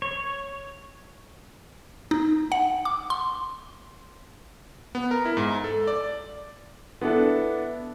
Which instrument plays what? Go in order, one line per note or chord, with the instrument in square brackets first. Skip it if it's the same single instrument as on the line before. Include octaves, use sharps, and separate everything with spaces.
[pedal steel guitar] C#5
[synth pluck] D#4
F#5
D6
C6
[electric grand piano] B3
A#4
E4
G#2
A4
D5
[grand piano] B3 D4 E4 A4